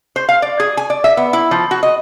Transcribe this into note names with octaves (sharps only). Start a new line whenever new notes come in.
C5
F5
D5
G#4
G#5
D5
E5
B3
E4
F3
F#4
D#5